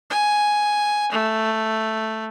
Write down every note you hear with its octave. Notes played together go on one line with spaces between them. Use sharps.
G#5
A3